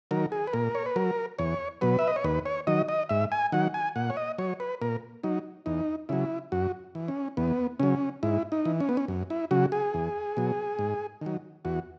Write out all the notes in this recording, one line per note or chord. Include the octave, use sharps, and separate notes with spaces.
D#3 F#3 A#4
G#4
B4
A#2 A#4
C#5
B4
F#3 A#4
E2 C#5
B2 F#3 B4
E5
D#5
C#5
D#2 B4
C#5
D#3 F#3 D#5
D#5
G#2 E5
G#5
D#3 F#3 F#5
G#5
A#2 F#5
C#5
D#5
F#3 C#5
B4
A#2 A#4
F#3 D#4
E2 D#4
C#3 F#3 E4
F#2 F#4
E3
C#4
E2 B3
C#3 F#3 C#4
G#2 E4
D#4
E3
C#4
B3
C#4
F#2
E4
C#3 F#3 F#4
G#4
E2
B2 F#3
G#2
D#3 F#3
E2 F#4